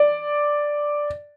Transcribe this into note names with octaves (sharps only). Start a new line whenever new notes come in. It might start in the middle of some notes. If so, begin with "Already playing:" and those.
Already playing: D5